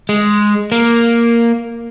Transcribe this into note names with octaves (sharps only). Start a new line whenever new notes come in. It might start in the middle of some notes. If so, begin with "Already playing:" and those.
G#3
A#3